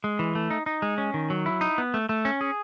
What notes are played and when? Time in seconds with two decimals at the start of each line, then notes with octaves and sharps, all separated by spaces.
0.04 G#3
0.19 E3
0.35 A3
0.50 D#4
0.66 D#4
0.82 G#3
0.98 C#4
1.14 D#3
1.30 F#3
1.46 E4
1.61 D#4
1.78 B3
1.94 A3
2.09 A3
2.25 C#4
2.41 G#4